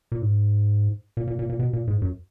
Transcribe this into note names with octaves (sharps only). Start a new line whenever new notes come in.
A#2
G#2
A#2
A#2
A#2
A#2
B2
A#2
G#2
F#2